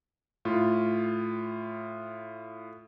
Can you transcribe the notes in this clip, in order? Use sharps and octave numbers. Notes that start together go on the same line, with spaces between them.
A2 F4